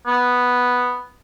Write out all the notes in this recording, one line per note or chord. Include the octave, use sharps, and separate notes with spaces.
B3